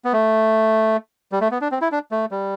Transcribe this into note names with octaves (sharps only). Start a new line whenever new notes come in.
B3
A3
G3
A3
B3
D4
C4
E4
D4
A3
G3